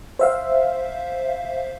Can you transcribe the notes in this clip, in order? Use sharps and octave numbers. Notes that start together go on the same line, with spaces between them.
C5 E5 F5